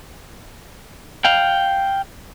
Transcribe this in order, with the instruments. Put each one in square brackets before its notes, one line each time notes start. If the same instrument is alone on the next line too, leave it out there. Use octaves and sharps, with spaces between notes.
[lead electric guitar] F5 G5